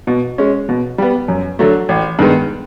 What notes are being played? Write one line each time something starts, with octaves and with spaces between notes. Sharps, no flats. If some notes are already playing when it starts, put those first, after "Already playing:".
B2
G#3 C#4
B2
G3 B3
F#2
D3 F#3 A3
A1
G2 D#3 G#3 B3